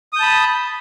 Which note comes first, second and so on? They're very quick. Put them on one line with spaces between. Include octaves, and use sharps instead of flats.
D#6 G6 A5 B5